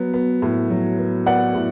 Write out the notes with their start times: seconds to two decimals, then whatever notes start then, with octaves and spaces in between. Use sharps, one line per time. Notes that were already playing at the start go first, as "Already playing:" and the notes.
Already playing: F#3 B3
0.14 B3
0.42 A2
0.70 F#3
0.98 B3
1.26 B3 D5 F#5
1.55 A2